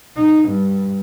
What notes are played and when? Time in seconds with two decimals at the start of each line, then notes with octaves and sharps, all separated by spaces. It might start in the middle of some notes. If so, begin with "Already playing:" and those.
0.17 D#4
0.49 G2